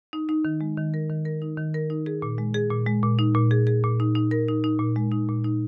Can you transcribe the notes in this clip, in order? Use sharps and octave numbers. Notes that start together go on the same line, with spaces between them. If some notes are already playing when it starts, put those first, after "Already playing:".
D#4
D#4
D#3
G#3
D#3
A#4
D#3
A#4
D#4
D#3
A#4
D#4
G#4
A#2
G#3
G#4
A#2
G#3
A#2
D#4
A#2
G#4
G#4
A#2
D#4
D#4
A#4
D#4
D#4
A#2
G#3
D#4
A#2
D#4